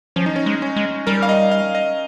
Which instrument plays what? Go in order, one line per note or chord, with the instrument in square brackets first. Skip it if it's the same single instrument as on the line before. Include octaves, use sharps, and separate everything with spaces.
[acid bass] F3 [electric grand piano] C#4
[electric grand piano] D#4
C#4
[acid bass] G#3
[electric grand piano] C#4
[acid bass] G#3
[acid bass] G3 [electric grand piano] A#4
[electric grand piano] F5
D#5
F5
D#5